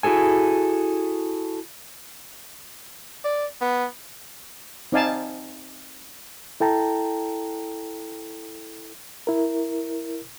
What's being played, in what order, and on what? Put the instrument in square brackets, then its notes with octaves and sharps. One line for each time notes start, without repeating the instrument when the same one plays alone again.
[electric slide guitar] E4 F#4 G#4 A4 G#5
[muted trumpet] D5
B3
[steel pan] C4 D#4 D5 F5 G#5 A5
[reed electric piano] E4 A4 G5 A5 A#5
E4 A#4